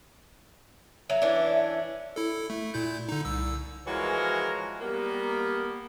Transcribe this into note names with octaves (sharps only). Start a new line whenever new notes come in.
F#3 E5
E3 C#4 D4
E4 A4
A3
A#2 E4 G6
D3 D#4
C2 E6
E3 F3 G#3 F#4 A#4 C#5
G3 A#3 B3